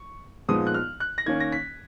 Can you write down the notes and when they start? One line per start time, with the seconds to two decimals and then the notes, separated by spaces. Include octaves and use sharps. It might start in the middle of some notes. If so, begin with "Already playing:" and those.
Already playing: C#6
0.48 A#2 F3 G#3 B3 D#4 D#6
0.67 F#6
0.74 F6
1.00 F#6
1.18 A#6
1.26 D#3 A#3 C#4 G#6
1.40 A#6
1.52 B6